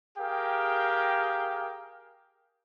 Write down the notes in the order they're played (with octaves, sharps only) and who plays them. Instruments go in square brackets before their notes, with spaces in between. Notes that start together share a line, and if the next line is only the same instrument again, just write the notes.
[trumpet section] G4 G#4 A#4 F5 G5